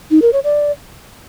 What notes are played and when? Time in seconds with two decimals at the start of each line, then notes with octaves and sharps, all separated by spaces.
0.11 D#4
0.22 A#4
0.33 C#5
0.44 D5